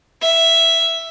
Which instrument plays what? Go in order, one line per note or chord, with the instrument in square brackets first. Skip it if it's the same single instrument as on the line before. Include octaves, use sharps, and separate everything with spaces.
[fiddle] E5